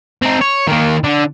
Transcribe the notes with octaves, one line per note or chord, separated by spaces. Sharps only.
C4 D#4
C#5
D#3 A#3
D3